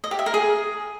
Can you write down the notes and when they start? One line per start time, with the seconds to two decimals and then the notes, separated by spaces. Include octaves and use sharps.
0.04 D#5
0.11 G4
0.19 E5
0.26 A#4
0.34 G#4